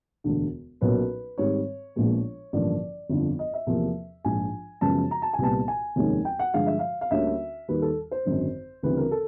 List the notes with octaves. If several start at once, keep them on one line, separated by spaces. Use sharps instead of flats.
E1 D2 D3
B1 A#2 F#3 A#3 C#4 B4
G#2 D#3 G3 C4 C#5
A#1 A#2 F3 G#3 B3
A1 G2 D3 F3 A#3 D5
G1 F2 D3
D#5
E5
E2 C3 F3 A#3
A#1 G#2 F3 G#5
F#2 C#3 F3 G#3 B3 A5
A#5
A5
G#5
C2 A#2 G3 B3 A5
G#5
F1 D#2 D#3 G#3 C#4
G5
F#5
G2 D3 F3 G#3 F5
E5
F5
F5
D2 D3 G3 A#3 C#4 E5
D#2 D#3 G3 B4
A4
C5
G#1 F#2 D3
D2 C#3 E3 G3 C4 B4
A#4
A4